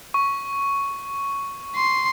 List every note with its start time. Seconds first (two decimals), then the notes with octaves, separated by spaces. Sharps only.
0.14 C#6
1.76 C6